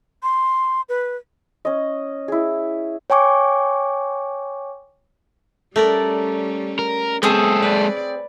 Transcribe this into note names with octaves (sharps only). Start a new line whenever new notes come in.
C6
B4
C#4 D#5
E4 G#4
C#5 G5 G#5 C#6 D6
G3 A3 C#4 A#4 D5
A#4
G#3 B3 C4 G#4 A4 C#5
B4 D5